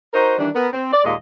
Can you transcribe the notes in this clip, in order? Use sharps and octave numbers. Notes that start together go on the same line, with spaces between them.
D#4 F#4 A#4 C5
D#3 E3 G3 D4
B3 A#4
C4
D5
D#2 A#2 G#3 D#5 F5